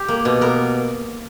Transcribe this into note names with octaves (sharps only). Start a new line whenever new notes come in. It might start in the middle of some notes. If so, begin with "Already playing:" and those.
Already playing: G4
A#3
B2
B3 A#4